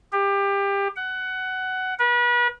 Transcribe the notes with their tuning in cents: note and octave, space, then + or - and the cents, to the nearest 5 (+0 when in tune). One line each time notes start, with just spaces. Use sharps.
G4 +25
F#5 +15
B4 -35